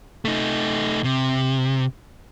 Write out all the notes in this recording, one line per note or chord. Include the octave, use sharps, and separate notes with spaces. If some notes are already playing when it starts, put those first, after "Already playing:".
A3 D#4
C3